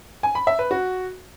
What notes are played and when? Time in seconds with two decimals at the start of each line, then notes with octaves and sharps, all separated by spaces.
0.23 G#5
0.35 B5
0.47 E5
0.59 B4
0.71 F#4